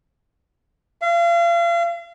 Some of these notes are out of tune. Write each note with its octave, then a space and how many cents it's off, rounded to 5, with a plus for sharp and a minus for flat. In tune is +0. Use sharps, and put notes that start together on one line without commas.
F5 -35